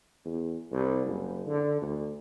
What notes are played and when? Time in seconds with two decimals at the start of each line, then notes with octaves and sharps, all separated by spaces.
0.25 E2
0.72 C2
1.06 F#1
1.48 D3
1.82 D2